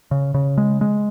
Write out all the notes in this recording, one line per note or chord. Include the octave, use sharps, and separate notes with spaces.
C#3
C#3
G#3
G#3